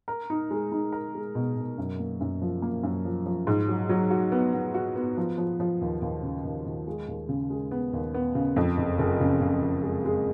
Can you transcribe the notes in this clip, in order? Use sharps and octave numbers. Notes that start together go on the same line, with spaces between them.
A#4
D#4
G#3
D#4
A#4
G#3
B2
B2
F#2
A#3
F#2
F3
A#3
F#2
F3
F3
G#2
F#3
F#3
F#4
B3
B3
F#4
B3
F3
F3
F3
D#2
D#2
C#3
D#2
D#2
G#3
D#2
C#3
G#3
B3
D#2
B3
C#3
F2
F#1
F#1
C#3
C#3
F#1
G#3
G#3